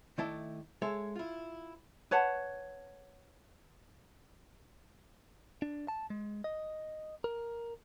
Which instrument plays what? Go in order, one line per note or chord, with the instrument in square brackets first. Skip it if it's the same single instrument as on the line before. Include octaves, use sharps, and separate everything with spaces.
[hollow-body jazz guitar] D#3 A3 E4 D5 A5
G#3 A4 C#5 E5
E4 F4
[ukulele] B4 C#5 F#5 A5
[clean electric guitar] D4
A5
G#3
D#5
A#4